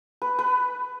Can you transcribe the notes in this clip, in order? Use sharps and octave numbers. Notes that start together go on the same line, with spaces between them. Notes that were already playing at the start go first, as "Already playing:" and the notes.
B4
B4